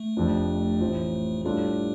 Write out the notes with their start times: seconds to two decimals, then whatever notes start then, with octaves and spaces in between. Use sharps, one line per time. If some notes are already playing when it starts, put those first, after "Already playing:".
Already playing: A3
0.17 F1 F2 F3 D4
0.81 A1 A2 F3 C4
1.45 A2 G3 A3 D4 F4 A4